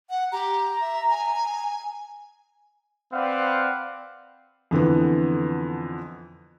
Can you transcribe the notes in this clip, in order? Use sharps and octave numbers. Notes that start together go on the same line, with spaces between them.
F#5
G4 A#5
E5
G#5
C4 B4 D5 F5 F#5
F2 D3 E3 B3